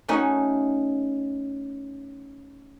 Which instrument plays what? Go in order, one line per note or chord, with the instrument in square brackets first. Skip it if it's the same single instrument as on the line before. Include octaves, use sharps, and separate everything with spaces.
[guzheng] A3 C#4 D#4 F#4